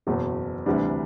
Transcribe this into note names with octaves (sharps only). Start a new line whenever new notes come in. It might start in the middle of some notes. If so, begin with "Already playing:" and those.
F#1 E2 B2
D2 C3 E3 G3 D4